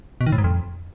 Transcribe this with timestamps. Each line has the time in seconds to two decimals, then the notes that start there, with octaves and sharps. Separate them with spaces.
0.21 B2
0.26 D#3
0.32 A2
0.38 G#2
0.44 F2